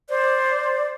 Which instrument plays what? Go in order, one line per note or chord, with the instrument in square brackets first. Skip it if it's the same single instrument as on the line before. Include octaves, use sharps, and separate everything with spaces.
[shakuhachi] C5 [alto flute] D5